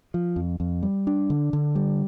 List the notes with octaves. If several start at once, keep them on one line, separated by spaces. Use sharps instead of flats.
F3
F2
F2
G3
D4
D3
D3
G3